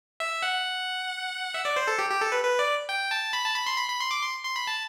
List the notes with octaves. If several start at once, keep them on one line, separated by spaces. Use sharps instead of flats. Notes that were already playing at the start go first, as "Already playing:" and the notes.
E5
F#5
E5
D5
C5
A4
G4
G4
A4
B4
B4
D5
G5
A5
B5
A5
B5
C6
B5
B5
C6
D6
C6
C6
B5
A5